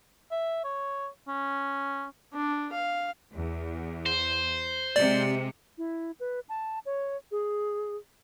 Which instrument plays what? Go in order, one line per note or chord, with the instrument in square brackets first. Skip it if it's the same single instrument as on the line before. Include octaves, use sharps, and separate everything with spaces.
[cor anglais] E5
C#5
C#4
[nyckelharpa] D4
F5
[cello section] E2
[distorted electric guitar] C5
[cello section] C3 G#3 [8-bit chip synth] D5
[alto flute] E4
B4
A5
C#5
G#4